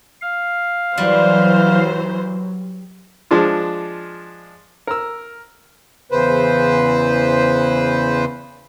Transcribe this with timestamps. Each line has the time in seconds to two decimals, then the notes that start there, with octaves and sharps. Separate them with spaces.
0.22 F5
0.98 E3 F#3 G3 C5
3.31 F3 G#3 D4 F4
4.87 A#4 E6
6.11 E2 C#3 B4 C5